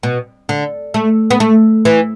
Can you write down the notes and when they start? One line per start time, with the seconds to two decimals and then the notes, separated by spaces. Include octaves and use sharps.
0.03 B2
0.49 D3
0.94 A3
1.31 B3
1.40 A3
1.85 E3